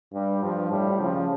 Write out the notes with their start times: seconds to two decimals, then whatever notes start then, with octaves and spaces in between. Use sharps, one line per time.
0.13 G2 G3
0.43 G2 F3
0.71 A2 G3
0.99 C#3 F3